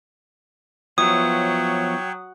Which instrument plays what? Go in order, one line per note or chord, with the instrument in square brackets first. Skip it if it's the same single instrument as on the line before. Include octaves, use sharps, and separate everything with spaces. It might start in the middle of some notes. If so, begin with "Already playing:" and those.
[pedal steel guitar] F3 B3 E4 [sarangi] F#3 [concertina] C#5 G5 [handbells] D#6